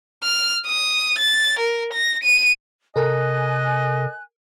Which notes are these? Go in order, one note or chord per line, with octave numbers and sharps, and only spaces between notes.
F6
D#6
A6
A#4
A#6
D#7
C3 A4 A#4 D#5 G#5 F#6